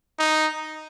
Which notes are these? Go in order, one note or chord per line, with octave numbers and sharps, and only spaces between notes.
D#4